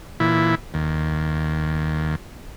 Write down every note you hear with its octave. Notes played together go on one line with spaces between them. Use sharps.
A#2 E3 E4
D#2